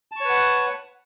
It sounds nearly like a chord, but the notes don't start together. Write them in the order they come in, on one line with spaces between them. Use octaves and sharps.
A5 C#6 C#5 B4 F#5